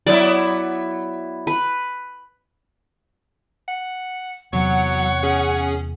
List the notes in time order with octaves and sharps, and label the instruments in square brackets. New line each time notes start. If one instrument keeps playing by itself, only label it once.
[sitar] F#3 B3 E4 [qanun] D5
[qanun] B4
[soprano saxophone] F#5
[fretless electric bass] E2 C3 [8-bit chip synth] F#3 [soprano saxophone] C#5 [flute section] F#5
[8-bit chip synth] C#4 G#4